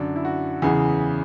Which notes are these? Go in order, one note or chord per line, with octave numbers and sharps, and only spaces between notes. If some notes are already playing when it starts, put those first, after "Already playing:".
Already playing: F#2 D3 D4
E4
F#4
E2 C#3 E3 G#4